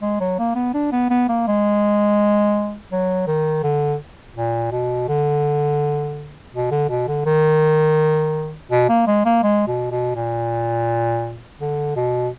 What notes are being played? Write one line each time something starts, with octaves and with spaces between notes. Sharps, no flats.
G#3
F#3
A#3
B3
D4
B3
B3
A#3
G#3
F#3
D#3
D3
A#2
B2
D3
B2
D3
B2
D3
D#3
B2
A#3
G#3
A#3
G#3
B2
B2
A#2
D3
B2